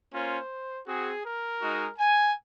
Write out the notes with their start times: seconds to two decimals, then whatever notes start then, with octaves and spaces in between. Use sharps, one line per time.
0.13 A#3 C#4 F4 C5
0.87 C4 F#4 G#4
1.25 A#4
1.61 G#3 D#4 F#4
1.98 G#5